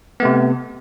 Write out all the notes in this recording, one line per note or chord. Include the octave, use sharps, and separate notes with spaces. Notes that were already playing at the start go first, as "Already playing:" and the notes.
C3 A3 B3